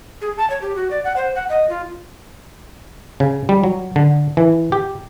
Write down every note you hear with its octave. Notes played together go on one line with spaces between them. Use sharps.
G#4
A5
C#5
G4
F#4
D5
F#5
C5
F#5
D#5
F4
C#3
G3
F#3
D3
E3
G4